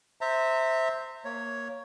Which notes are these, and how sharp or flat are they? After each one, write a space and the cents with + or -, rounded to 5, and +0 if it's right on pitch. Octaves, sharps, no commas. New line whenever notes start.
C5 +0 E5 -15 A#5 -35
A#3 +0 C#5 +5